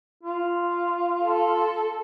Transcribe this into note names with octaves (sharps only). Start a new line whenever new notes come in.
F4
A4